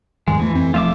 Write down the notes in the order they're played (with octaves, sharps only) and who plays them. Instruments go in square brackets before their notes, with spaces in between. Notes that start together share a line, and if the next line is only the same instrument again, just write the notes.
[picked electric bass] E2 G#2 D#3 [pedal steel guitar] G#3
[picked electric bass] E2 A3 [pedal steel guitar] E3
[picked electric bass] F2 C4
[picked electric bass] E1 F3 A3 [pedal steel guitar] F4 E5 D6